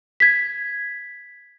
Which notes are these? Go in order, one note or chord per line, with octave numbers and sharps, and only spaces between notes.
G#6 B6